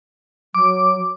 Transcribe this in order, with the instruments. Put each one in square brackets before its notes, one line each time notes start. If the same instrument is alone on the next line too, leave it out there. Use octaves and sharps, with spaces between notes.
[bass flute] F#3 [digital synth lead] D6